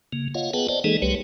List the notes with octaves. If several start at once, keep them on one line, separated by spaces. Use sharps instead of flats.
C#3 A#3
F4 C#5 D#5 F5 F#5
B3 G#4 B4 F#5 G5 A5
C5 D5 D#5 A5
E3 G#3 A#3 D#4 G#4 A4
C2 F#3 G#3 G4 B4 C#5